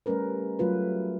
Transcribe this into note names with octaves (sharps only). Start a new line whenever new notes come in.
G3 A3 C#4 A#4 B4
F#3 A3 F4 B4